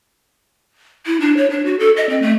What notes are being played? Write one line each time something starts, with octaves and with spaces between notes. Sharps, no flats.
E4
D4
C#5
D4
F#4
A4
D#5
C4
A3